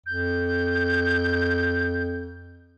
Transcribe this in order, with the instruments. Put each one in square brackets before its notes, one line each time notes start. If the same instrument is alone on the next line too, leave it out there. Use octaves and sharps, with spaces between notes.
[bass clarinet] F2 [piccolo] G6